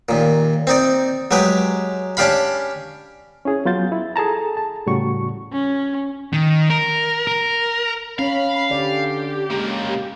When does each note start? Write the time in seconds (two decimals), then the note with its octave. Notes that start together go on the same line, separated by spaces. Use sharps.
0.09 D#2 A#2
0.67 C4 D#4 D5
1.31 F#3 G#3 G4 B4
2.17 C#4 D4 G4 F5 B5
3.45 C#4 E4 G#4
3.65 F#3 B3 F4 G6 A6
3.92 E4
4.16 G#4 A4 A5 A#5
4.57 A5
4.86 E2 A2 C#3 G3 F#4 C#6
5.53 C#4
6.33 D#3
6.70 A#4
7.27 A#4
8.19 C#4 C#5 F5 B5
8.71 D3 G4 D5
9.51 C#3 G#3 A#3